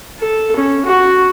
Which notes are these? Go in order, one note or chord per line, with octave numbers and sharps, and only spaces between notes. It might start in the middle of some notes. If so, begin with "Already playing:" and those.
A4
C#4
F#4